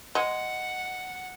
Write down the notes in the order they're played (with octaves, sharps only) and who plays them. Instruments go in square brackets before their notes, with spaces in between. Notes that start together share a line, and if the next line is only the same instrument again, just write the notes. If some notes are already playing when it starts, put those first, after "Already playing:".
[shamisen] G#3 [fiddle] F#5